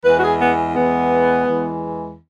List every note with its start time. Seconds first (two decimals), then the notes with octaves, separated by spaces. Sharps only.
0.04 E2 E3 G#3 B4
0.18 F#4
0.22 G#4
0.40 B3
0.75 E2 E3 G#3 B3
1.45 E2 E3 G#3